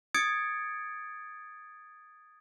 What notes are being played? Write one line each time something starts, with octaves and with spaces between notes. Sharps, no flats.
D#6 G#6 A6 C#7 D7